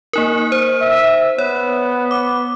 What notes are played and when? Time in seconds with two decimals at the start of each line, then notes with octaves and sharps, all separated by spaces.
0.13 A#3 D#4 A#4
0.52 C5
0.82 E5
1.38 B3 C#5
2.11 D6